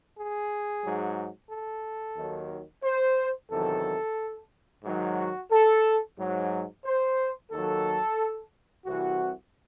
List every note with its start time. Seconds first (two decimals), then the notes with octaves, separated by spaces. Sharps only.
0.17 G#4
0.83 G#2 F#3
1.50 A4
2.17 D#2 D#3 F#3
2.84 C5
3.50 E2 C3 D#3 F#3 A4
4.84 G#2 D#3 F#3
5.17 F#4
5.51 A4
6.19 G#2 F#3
6.85 C5
7.51 D#2 D#3 F#3 A4
8.85 C2 C3 E3 F#4